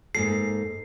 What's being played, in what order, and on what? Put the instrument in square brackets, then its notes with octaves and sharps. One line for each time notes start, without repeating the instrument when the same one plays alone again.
[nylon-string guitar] G#2 A#3 A4 [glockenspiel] C7